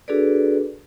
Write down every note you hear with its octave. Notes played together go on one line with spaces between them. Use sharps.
D4 F#4 G#4 A4 B4 D5